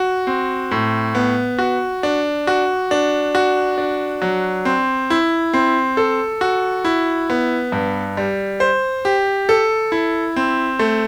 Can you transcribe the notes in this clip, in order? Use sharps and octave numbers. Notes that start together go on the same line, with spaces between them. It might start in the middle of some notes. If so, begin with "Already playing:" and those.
Already playing: F#4
C4
A2
B3
F#4
D4
F#4
D4
F#4
D4
F#3
C4
E4
C4
A4
F#4
E4
B3
G2
G3
C5
G4
A4
E4
C4
A3